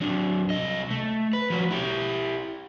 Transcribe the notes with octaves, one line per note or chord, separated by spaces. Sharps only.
F#3 D4
C2 D#5
A3
B4
F3 F#4
E4 G4